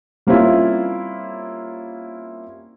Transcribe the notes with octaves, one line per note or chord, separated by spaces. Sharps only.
G3 A#3 C4 C#4 E4 F4